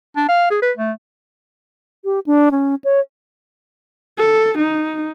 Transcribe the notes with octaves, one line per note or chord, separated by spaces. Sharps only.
D4
F5
G#4
B4
A3
G4
D4
C#4
C#5
A4
D#4